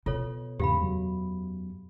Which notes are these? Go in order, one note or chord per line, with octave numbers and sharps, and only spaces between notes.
B2 F4 A4 C#5
E2 G#2 C#3 G4 F5 B5
F#2 F#3